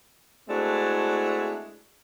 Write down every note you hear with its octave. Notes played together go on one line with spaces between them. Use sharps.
G#3 A3 C4 D4 E4 F#4